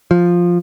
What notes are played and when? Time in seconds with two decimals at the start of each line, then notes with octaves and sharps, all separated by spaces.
0.11 F3